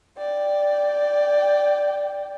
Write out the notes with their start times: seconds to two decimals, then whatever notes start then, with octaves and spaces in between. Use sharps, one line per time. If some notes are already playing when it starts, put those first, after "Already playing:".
0.18 D5 G5